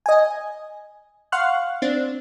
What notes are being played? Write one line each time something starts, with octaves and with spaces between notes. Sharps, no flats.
D#5 G#5
F5 F#5 C6 C#6 F6 F#6
C4 D4